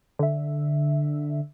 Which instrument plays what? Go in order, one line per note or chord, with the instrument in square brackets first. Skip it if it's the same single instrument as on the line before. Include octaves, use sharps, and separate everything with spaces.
[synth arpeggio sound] D3 E5